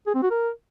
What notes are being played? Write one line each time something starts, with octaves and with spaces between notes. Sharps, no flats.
G#4
C4
F#4
A#4